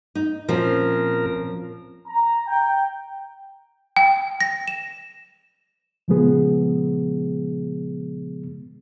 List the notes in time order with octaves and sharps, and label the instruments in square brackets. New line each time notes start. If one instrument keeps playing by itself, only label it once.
[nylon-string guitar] D#4
[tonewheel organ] A#2 A#4 [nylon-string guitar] F3 C4 C#4
[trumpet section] A#5
G5
[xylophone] G5
A#6
E7
[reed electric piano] A#2 C#3 F3 G#3 B3 G#4